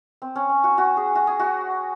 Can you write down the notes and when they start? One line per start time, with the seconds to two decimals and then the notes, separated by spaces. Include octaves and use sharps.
0.22 C4
0.36 C#4
0.49 C#4
0.64 F#4
0.78 F#4
0.97 G#4
1.15 F#4
1.27 G#4
1.40 F#4